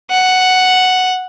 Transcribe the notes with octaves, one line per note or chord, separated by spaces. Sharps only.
F#5